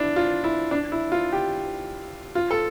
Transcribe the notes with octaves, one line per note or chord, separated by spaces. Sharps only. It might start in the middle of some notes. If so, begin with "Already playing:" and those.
Already playing: D4 E4
F4
E4
D4
E4
F4
G4
F4
A4